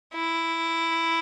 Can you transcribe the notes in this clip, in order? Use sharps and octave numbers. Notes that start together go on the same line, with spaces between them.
E4